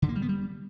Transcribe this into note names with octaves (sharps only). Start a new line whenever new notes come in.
D3
A#3
G3
B3
G3